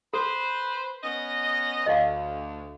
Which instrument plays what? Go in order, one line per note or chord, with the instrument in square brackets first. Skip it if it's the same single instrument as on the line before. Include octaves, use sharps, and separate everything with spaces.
[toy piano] A4 [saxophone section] B4 C5
[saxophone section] B3 C#4 D#5
[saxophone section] D2 [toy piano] D#5 F5